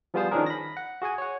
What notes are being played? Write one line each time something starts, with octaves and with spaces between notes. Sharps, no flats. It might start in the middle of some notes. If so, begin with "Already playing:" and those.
F3 G3 B3 F4 G#4 C5
D#3 F3 C#4 D4 G#4 A#4
B5 A#6
F#5
F#4 G#4 F#5 G#5
C#5 F#5